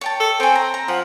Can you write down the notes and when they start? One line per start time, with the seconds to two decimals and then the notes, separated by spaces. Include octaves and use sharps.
0.01 C#5 G5 A5
0.20 A4
0.40 C4 G#5 C#6
0.55 A#5
0.74 A#5
0.88 F3 F#5